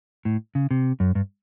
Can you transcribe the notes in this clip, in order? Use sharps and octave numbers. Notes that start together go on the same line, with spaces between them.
A2
C#3
C3
F#2
G2